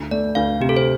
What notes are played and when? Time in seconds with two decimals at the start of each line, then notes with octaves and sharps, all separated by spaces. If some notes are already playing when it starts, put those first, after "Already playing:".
Already playing: D2
0.11 A3 D5
0.35 D2 F5
0.60 C3 G4
0.69 A4
0.77 C5